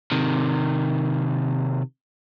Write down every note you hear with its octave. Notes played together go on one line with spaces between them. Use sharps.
C3 D#3